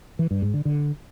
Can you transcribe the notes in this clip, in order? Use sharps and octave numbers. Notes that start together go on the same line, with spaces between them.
E3
G2
G#2
D3
D3